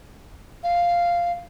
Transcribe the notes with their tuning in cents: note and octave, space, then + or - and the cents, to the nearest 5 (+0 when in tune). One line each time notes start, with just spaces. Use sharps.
F5 -5